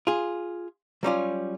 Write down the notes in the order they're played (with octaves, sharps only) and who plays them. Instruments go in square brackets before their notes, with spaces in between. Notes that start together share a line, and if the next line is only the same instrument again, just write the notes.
[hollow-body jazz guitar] F4 G#4
F#3 G3 C#4 F4